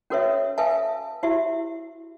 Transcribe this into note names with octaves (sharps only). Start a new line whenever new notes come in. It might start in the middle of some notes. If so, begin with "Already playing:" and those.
C#4 F#4 A4 B4 C#5 E5
A4 B4 E5 F5 G#5 A5
E4 F#4 G4 E5